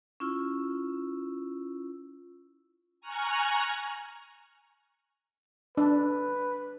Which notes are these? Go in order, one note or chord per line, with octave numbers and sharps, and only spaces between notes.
C#4 E4 F4 E6
G#5 A#5 C#6 F6 F#6
D4 B4